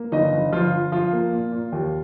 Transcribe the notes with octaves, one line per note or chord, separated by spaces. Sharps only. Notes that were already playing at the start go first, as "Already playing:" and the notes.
Already playing: A#3
G1 D#4 D#5
G1
G1 F3 F4
F3
F3 F4
A#3
A#2
A#2
D#2